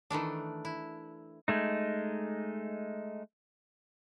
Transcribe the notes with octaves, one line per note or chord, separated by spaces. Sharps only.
D#3 E3 A3 D4
E4
G#3 A3 D#4